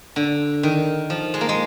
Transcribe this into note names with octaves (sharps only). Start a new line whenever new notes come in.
D3
D#3
F3
G#3
A#3
G#3